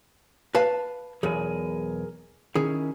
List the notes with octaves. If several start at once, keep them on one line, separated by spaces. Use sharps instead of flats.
B4 F5 A5
B1 E2 G#4 A#4 G#5
D#3 C#4 E4 G#4